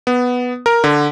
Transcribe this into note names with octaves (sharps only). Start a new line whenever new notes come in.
B3
A#4
D3